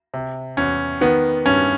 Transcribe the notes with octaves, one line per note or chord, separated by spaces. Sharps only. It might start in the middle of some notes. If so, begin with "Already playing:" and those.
C3
E2 C#4
D#3 B3
G2 C#4